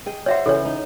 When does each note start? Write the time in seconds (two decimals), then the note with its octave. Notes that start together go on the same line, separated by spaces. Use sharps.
0.06 G#4 D#5 G5
0.26 F4 A4 C5 C#5 E5 F#5
0.46 C#3 E3 A4 C#5
0.65 D#4